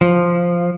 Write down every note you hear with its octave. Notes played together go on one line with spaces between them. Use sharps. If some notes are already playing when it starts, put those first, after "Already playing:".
F3